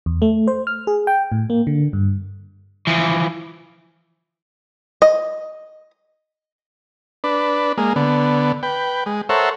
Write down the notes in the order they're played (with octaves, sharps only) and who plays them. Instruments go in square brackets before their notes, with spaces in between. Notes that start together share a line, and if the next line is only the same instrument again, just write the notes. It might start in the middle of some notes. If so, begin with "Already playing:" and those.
[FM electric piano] E2
A3
C5
F6
G#4
G5
A2
A#3
D3
G2
[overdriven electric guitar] E3 F3
[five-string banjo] D#5
[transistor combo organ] D4 B4
G#3 A#3
D3 B3
B4 G5
G#3
A4 A#4 C5 C#5 E5 F#5